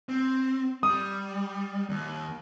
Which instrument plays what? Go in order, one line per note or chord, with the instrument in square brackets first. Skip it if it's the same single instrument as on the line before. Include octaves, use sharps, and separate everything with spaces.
[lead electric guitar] C4
[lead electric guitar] G3 [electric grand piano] D#6
[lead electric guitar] D#2